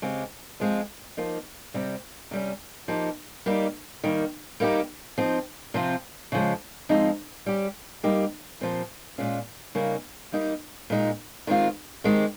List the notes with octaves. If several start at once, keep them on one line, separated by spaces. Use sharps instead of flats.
C#3 G#3 C4 G4
F3 G#3 C4 F4
F3 A#3 D#4
C3 G3 C4
C3 G3 C#4
F3 A#3 D#4 G4
G3 A#3 D#4 G4
D#3 G3 A#3
G3 A#3 D#4 G4
F3 C4 D#4
C3 F3 C4 F4
C#3 F3 G#3
F3 G#3 C4 D#4
G3 C#4 G4
G3 A#3 D#4 G4
A#2 F3 C4 G4
A#2 G#3 C#4 F4
C#3 G3 A#3 D#4
G3 A#3 D#4 G4
A#2 G#3 D#4
D#3 G#3 C4 F4
D#3 G#3 C4 G4